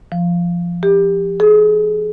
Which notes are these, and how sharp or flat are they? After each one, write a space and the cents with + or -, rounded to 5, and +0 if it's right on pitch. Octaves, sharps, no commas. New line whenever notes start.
F3 -10
G4 +20
G#4 +35